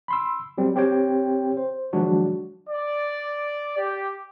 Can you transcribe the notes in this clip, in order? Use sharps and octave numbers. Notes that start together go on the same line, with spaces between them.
B5 C6 E6
F#3 G3 C4
C4 G4 C#5 G5
C5
D#3 F3 F#3 G#3 D4 F#4
D5
G4